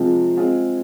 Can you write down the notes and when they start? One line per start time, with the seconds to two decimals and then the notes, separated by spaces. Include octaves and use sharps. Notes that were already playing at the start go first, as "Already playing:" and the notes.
Already playing: C3 F3 G#3 C4 F4
0.37 G#3 C4 F4 G#4